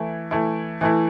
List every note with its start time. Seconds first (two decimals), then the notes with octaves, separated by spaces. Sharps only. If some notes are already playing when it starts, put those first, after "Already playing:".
Already playing: E3 A3 E4
0.31 E3 A3 E4
0.81 E3 A3 E4